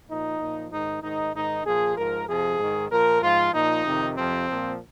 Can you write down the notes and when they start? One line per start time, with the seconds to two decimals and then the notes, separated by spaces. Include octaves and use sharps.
0.08 A#2 F3 D#4
0.40 A#2 F3
0.71 G#2 D#3 D#4
1.02 G#2 D#3 D#4
1.34 G#2 D#3 D#4
1.65 A#2 F3 G#4
1.97 G#2 F3 A#4
2.28 F2 C3 F3 G#4
2.59 G#2 D#3
2.91 A#2 F3 A#4
3.22 G#2 F3 F4
3.53 A#2 F3 D#4
3.85 F2 C3 D#3
4.16 F2 C3 F3 C4
4.47 A#2 F3